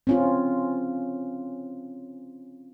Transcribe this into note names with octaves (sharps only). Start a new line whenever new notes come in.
C4 C#4 F4